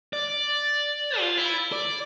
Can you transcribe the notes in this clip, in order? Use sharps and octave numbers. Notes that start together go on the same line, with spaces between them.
D5
F4
E4
D5